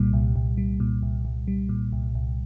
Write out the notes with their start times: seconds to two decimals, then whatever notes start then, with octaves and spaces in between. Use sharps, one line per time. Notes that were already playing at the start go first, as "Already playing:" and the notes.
Already playing: C2 A#2 G3
0.13 C2
0.36 C2
0.58 G3
0.80 A#2
1.02 C2
1.25 C2
1.48 G3
1.69 A#2
1.92 C2
2.15 C2